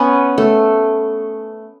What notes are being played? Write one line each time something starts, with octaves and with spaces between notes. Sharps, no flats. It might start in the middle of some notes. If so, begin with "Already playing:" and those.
Already playing: B3 C#4
A3